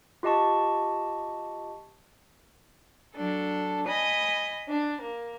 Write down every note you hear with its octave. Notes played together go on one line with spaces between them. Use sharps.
F4 G4 D#5 A5 C#6
F#3 D4 A4
D#5 G#5 B5 D#6
D4
A#3